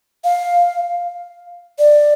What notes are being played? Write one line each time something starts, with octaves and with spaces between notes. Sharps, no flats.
F5
D5